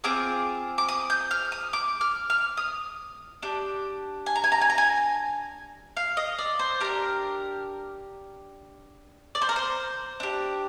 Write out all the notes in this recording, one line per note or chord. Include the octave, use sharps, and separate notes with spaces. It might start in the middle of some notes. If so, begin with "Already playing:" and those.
C4 F4 G#4 D6
D6
D#6
G6
F6
D#6
D6
F6
F6
D#6
D4 G4
G#5
A#5
G#5
A#5
G#5
A#5
G#5
F5
D#5
D5
C5
D4 G4 A#4
D5
C5
A#4
C5
D4 G4